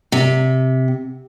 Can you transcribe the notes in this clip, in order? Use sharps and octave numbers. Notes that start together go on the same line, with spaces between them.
C3